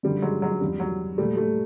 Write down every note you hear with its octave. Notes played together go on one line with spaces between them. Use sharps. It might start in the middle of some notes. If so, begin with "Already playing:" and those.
F#2 D3 F3 G3
F#3 G#3
F#3 G#3
E2 C#3 F3 G3
F#3
A#2 F3 G3 A3
G3 A3